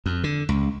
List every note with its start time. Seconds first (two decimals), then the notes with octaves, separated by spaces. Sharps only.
0.06 F2
0.24 D3
0.49 C#2